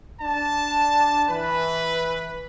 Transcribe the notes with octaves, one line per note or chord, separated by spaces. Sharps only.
D4 A5
E3 B4